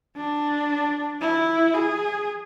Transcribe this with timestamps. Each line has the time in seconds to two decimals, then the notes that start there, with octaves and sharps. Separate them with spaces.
0.17 D4
1.21 E4
1.74 G#4